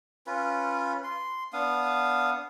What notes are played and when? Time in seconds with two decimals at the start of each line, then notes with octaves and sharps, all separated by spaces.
0.27 C#4 F4 B4
1.04 C6
1.53 B3 D4 F5 D#6